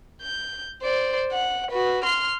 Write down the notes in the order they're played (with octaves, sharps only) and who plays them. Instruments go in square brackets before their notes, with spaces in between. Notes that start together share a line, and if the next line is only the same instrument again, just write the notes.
[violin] G6
C5 D5
F#5
F#4 B4
C6 F6